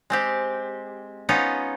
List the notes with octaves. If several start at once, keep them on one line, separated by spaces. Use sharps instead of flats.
G#3 C4 G4
B3 C#4 D#4 F4